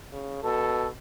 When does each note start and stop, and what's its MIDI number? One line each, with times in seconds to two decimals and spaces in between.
0.12 0.40 49
0.43 0.88 47
0.43 0.88 69